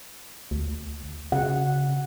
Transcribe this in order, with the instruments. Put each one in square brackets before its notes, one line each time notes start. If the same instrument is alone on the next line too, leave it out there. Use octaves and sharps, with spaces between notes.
[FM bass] D2
[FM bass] C#3 [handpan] F#5